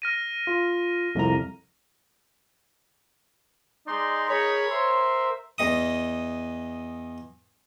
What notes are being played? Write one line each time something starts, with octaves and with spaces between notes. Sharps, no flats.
F6 A#6 D#7
F4
C2 F2 C3 A#5
G#3 D#4 D5 C6
G#4 A#4 C#5 B5
A#4 C5 E5 C6
E2 D#5 D#6